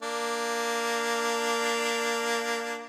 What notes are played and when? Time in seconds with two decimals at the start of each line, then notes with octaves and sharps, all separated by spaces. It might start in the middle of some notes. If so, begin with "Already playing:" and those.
0.02 A#3 D4